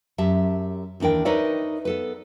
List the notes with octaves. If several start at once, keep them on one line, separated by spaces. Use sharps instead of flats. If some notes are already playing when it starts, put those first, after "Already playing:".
F#2 G4 E5 A5
D#2 E3 D4 A#4 G5
D#4 A#4 B4 C#5 D5 E5
B3 A4 B4